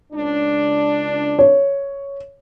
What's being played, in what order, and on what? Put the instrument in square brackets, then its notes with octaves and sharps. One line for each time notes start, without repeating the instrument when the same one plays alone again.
[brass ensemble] C#2 D4
[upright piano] C#5